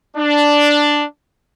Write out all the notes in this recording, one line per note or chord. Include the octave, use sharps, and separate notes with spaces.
D4